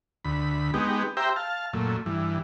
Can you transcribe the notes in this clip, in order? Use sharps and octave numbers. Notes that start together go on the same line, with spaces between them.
D2 B5
G#3 B3 D#4 G4
G4 C5 E5 G5 A#5
F5 A5
F#2 A#2 A3
G2 E3